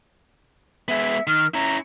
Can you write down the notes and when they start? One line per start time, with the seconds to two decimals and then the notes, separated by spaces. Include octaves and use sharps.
0.88 G#3 B3 E5
1.27 D#3 F6
1.54 C#4 E4 A#5